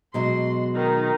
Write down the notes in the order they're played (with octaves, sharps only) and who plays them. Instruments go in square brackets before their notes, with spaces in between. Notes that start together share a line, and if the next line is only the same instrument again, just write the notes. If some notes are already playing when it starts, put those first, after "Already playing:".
[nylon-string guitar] B2 F#3 G#3 [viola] C6
[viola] D#3 D#4